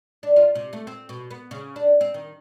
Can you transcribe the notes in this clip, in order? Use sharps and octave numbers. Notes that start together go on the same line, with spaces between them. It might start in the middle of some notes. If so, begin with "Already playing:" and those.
D4
F4
C3
A3
C4
B2
B3
C#3
D4
C4
D#3